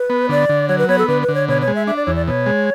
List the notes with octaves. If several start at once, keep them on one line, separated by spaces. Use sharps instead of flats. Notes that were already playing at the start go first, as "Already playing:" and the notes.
Already playing: B4
B3
D3 D5
D3
F#3 C#5
B4
B3 C#5
A4
D3 B4
B4
D3
C#5
B2 C#5
C#5
G#3
E5
D4 E5
D5
E2 C#5
D5
B2 C#5
G#3